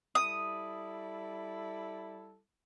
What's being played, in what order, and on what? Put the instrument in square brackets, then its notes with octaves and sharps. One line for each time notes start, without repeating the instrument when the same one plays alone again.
[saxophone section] G3 E4 A4 [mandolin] D#6